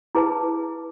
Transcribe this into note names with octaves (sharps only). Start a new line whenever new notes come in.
E4 G#4 B4 A5